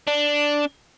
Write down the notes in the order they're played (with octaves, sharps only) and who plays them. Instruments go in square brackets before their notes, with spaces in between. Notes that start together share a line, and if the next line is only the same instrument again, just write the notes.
[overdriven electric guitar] D4